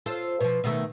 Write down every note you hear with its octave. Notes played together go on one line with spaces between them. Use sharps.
F4 A4 C5
B2 F3
B2 D#3 A3